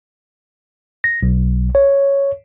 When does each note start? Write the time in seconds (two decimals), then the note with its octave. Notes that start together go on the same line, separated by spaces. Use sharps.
1.04 A#6
1.23 B1
1.75 C#5